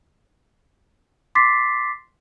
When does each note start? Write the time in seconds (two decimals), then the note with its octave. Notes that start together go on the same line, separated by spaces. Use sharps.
1.35 C6 D6 A6 B6 C7